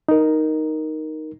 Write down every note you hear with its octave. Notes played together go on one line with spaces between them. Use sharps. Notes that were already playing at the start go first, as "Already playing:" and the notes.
D#4 A#4